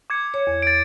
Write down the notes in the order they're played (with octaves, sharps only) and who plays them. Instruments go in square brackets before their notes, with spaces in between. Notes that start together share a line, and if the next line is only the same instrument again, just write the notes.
[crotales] D6 G#6 C#7
[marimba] C#5
E2
[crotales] A6 D7